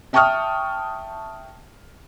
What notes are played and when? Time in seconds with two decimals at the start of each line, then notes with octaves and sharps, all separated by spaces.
0.13 E5 G5 A5 C#6 D#6 F6